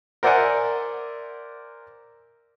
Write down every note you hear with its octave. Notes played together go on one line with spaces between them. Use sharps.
A#4 C5 D5 E5 F#5 G#5